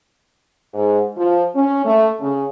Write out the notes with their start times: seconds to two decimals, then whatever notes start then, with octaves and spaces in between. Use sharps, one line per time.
0.74 G#2
1.18 F3
1.56 C#4
1.85 A3
2.20 C#3